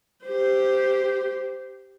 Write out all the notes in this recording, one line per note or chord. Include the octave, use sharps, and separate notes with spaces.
G4 C5